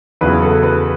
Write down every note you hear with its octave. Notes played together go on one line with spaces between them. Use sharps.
E2 C#3 F#3 B3 E4 B4
A4
B4